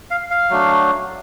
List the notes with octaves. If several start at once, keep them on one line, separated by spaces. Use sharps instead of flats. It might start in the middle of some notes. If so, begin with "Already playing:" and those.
F5
F5
F#3 A3 D4